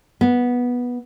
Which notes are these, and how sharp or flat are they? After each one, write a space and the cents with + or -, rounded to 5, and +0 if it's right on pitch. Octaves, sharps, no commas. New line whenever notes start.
B3 -10